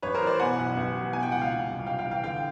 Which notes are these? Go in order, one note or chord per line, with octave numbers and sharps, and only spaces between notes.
A1 B4 C#5
A#4 C5
E3
C5 D5
B2 F#5 G#5
B1
A1
E3
B2 G#5
G5
C#2 F#5
F5 G5
A#2
C2
A#1 F5 G5
F5 G5
E3
F5 G5
D3 F5 G5